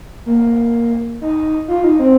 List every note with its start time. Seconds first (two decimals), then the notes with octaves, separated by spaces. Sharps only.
0.26 A#3
1.21 D#4
1.68 F4
1.84 D#4
1.99 C4